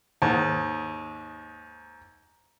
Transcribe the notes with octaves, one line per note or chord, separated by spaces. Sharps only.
D#2 G#2